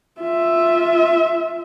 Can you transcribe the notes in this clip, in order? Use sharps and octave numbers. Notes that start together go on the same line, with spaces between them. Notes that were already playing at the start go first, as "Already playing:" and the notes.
F4 E5